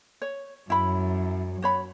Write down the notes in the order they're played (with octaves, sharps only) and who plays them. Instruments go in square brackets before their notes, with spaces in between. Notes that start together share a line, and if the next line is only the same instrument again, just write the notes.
[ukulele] C#5
[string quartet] F#2 [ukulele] E4 B5
[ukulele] F#4 C#5 B5